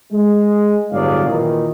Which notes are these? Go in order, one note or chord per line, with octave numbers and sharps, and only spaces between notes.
G#3
G1 A2 F#3 G#4 D5 F5
A#2 D#3 E3